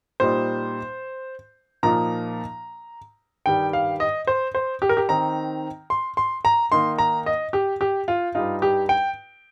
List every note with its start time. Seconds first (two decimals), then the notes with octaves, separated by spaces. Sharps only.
0.20 A#2 G3 D#4 C5
1.83 A#2 F3 A#3 D#4 A#5
3.46 G2 D#3 G3 G5
3.73 F5
4.00 D#5
4.27 C5
4.55 C5
4.82 G4
4.89 A#4
4.97 G4
5.09 D#3 C4 D#4 A#5
5.90 C6
6.17 C6
6.45 A#5
6.72 D#3 A#3 D#4 C6
6.98 A#5
7.26 D#5
7.53 G4
7.81 G4
8.08 F4
8.35 G2 G3 D#4 F4
8.62 G4
8.89 G5